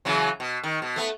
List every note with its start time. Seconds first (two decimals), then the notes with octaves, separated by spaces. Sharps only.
0.05 C#3 E3 F#3
0.40 B2
0.63 D#3
0.82 B2
0.96 A3 B3